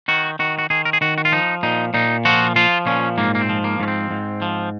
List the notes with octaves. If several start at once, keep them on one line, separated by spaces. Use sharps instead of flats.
D#3 F#4
D#3 F#4
F#4
D#3 G#4
A#4
G#4
D#3 F#4
F#4
F4
F3 D#4
A#2 D#4
A#2 D#4
F3 F#4
F3 F4
A#2 C#4
G#2 A#3
A#3
C4
F3
A#3
G#2 C#4
C4
G#2
F3